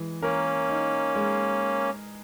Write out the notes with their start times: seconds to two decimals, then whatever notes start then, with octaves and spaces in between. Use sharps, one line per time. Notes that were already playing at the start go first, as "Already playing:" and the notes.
Already playing: E3 G#3
0.22 A#3 C#4 A#4
0.69 D#4
1.16 G#3